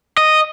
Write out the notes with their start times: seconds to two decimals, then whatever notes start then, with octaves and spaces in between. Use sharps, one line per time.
0.17 D#5